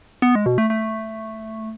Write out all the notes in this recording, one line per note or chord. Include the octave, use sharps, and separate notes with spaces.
B3
G#3
B2
A3
A3